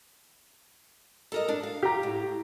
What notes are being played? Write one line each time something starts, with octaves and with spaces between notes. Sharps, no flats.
A4 A#4 D#5
D4
F5
G4 A#5
A2